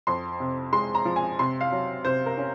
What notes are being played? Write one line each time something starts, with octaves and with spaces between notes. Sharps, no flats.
F2 C6
C3
G#3 C6
A#5
F3
G#5
C3 C6
F5
F#3
C3 C5
A#4
C#4